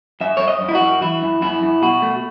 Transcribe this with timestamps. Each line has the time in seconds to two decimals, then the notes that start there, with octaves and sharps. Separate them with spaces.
0.21 F#2 E5
0.37 F#2 C#5
0.48 D#5
0.61 F#2
0.69 E4
0.75 F#4
0.81 F#2
1.01 E3 E4
1.22 F#2
1.42 F#2 E4
1.62 F#2
1.82 B2 F#4
2.02 A3